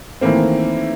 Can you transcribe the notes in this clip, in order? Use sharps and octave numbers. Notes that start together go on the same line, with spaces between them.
D#3 E3 A3 A#3 C4